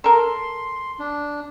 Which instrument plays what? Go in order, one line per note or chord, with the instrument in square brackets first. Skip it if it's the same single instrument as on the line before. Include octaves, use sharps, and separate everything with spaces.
[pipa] A4 A#4 [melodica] C6
[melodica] D4